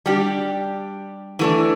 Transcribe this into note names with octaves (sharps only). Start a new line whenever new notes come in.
G3 D4 G4
E3 A3 D4